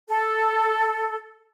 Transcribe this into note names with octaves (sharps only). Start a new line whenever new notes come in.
A4